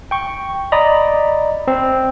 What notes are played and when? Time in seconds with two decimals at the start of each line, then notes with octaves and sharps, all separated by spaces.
0.11 G5 C#6
0.72 D5 D#5 A#5 B5
1.68 C4